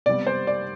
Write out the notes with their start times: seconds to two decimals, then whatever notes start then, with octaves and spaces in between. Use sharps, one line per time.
0.06 C3 G3 B3 D5
0.27 C5
0.47 D5